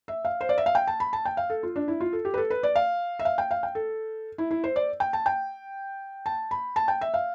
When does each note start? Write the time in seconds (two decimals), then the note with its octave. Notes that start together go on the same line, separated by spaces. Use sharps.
0.08 E5
0.25 F5
0.41 C5
0.49 D5
0.58 E5
0.66 F5
0.75 G5
0.87 A5
1.00 B5
1.13 A5
1.25 G5
1.37 F5
1.50 A4
1.63 F4
1.76 D4
1.88 E4
2.00 F4
2.13 A4
2.25 G4
2.34 B4
2.38 A4
2.50 B4
2.63 D5
2.76 F5
3.19 E5
3.25 F5
3.38 G5
3.51 F5
3.63 G5
3.75 A4
4.38 E4
4.51 E4
4.64 C5
4.76 D5
5.00 G5
5.13 A5
5.26 G5
6.26 A5
6.51 B5
6.76 A5
6.88 G5
7.01 E5
7.14 F5